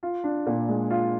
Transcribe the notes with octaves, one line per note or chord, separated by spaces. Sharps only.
F4
D4
A#2
G#3
F4